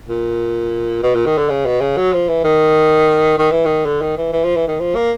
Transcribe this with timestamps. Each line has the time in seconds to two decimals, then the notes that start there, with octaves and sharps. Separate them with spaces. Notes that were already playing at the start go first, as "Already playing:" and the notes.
0.08 A#2
1.03 B2
1.15 A#2
1.26 D#3
1.38 D3
1.49 C#3
1.66 B2
1.81 C#3
1.97 F#3
2.13 F3
2.28 E3
2.44 D#3
3.38 D#3
3.52 E3
3.65 D#3
3.86 D3
4.01 D#3
4.17 E3
4.33 E3
4.44 F3
4.56 E3
4.68 D#3
4.80 F3
4.95 A#3